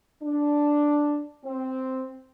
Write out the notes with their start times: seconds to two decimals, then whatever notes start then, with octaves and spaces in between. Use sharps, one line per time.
0.23 D4
1.44 C4